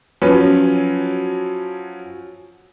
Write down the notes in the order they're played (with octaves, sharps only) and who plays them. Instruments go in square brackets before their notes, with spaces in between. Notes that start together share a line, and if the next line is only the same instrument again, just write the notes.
[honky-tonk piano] F3 F#3 C#4 B4